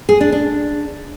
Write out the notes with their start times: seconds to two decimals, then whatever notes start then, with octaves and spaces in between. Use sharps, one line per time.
0.09 G#4
0.21 D4
0.32 D4